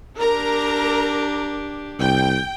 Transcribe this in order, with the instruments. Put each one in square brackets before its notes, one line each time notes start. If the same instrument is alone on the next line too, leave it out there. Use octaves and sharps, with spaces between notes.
[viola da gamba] D4 G4 [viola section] A#4 A#5
[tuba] C2 [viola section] G5